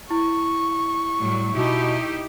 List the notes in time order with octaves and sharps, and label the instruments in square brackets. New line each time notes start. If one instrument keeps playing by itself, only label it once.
[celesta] E4 [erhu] C#6
[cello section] A2 F#3 G3
[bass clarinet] B2 [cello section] D#4 E4 G4